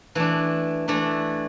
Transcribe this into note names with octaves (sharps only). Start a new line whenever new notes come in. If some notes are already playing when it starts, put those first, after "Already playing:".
E3 A3 D4
E3 A3 D4